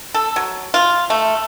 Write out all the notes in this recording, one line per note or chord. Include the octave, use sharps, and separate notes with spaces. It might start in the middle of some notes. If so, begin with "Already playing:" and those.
A4
F#3
F4
A3